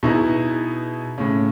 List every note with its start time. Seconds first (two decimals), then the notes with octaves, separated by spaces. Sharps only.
0.03 B2 D#4 E4 G#4 A#5
1.18 A2 C#3